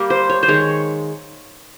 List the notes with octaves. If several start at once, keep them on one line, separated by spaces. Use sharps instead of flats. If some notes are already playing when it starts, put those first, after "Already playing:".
Already playing: G3 A#3
C5
C#5
C5
D#3 G#3 C#5